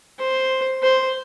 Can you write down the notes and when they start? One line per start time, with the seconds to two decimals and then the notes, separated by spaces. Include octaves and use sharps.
0.19 C5
0.83 C5